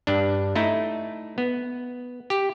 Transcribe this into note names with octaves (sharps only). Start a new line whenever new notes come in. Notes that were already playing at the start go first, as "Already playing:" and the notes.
G2 D4
A3 D#4 E4
B3
G4